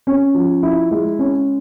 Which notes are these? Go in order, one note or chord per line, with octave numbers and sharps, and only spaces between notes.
C#4
F3
E4
G#3
C#4